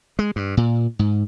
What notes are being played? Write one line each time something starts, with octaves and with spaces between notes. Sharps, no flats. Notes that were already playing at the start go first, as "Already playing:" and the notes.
G#3
G2
A#2
G#2